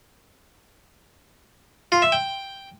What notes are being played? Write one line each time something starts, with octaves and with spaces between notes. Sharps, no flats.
F4
E5
G5